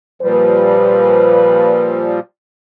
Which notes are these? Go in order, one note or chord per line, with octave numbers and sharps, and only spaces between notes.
A#2 F3 G3 B4